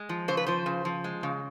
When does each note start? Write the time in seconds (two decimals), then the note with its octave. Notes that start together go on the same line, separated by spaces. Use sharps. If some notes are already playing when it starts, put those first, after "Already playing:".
Already playing: G#3
0.09 F3
0.28 C#3 C5
0.37 B4
0.46 F3 C5
0.66 C#3
0.85 F3
1.04 G#3
1.23 C#3